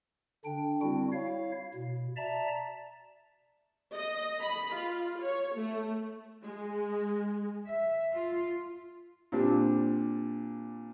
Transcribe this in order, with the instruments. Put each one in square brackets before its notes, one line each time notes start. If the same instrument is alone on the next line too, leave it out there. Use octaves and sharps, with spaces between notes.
[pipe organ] D3 D4 G5
G3 C4 E4 F#4
E4 C#5 F5
B2
D5 E5 A5 A#5
[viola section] D#5
B5
F4
C#5
A3
[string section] G#3
[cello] E5
F4
[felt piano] A#2 G3 C4 D4